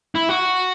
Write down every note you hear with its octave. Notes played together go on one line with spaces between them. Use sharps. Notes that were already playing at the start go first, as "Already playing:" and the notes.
E4
F#4